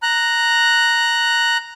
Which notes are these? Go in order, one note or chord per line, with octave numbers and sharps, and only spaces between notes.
A#5 F#6